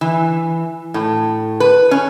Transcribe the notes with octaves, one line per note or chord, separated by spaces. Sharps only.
E3
A2
B4
C#4